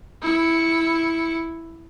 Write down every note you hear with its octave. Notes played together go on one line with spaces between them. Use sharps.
E4 C#7